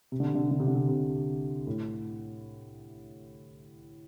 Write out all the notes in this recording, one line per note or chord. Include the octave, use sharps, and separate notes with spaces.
C3
D3
C3
D3
C3
D3
C3
D3
C3
C3
A2